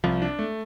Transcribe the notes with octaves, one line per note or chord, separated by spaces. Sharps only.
C2 F3
D4
A3